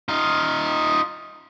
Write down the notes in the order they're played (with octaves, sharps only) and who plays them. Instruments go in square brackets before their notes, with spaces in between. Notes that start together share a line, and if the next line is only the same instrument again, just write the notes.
[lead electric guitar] D#4 F4